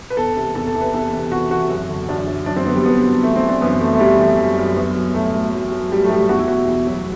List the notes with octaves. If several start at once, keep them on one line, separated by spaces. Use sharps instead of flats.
B4
E2 A4
C3
E2 A4
A4
E3
B4
E2 A4
C3
E2 F#4
E3 F#4
F#2
D3
F#2 D4
F#3
F#2 D4
C4
D3 B3
G3
F#2 B3
F#3
E3 A3
C4
E3
D4
F#2 B3
F#2 A3
A3
E3 G3
E3 A3
F#2
F#2
F#3 B3
F#3
A2 A3
A2
F#3
F#3
A2 G3
A3
A2 G3
E2 F#4
E4
B2 F#4
E2
F#3